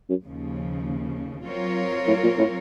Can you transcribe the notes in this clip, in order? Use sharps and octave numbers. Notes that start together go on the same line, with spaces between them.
F#2
D#2 C#3 F3
F#3 C4 F4 A#4 C#5
A2
A#2
A2